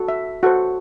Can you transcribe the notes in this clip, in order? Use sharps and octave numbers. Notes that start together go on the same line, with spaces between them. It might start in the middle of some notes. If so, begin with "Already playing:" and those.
Already playing: F#4 A4
E5
F#4 A4 C5 F#5